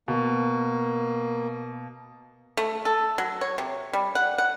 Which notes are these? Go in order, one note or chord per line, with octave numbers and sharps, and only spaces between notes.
B2 A#3
A3
A4
F#3
C#5
C3
G3
F#5
F#5